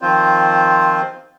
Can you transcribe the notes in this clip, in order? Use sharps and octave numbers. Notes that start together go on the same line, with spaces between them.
D#3 F3 C4 F4 C5